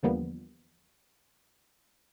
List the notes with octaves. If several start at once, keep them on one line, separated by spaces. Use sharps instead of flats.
E2 D3 F3 G3 A#3 B3